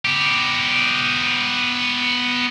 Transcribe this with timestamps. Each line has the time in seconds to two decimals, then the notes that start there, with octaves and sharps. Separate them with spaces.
0.05 B3 G4